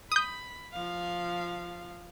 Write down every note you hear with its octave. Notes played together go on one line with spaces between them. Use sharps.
B5 D#6 G6
F3 F5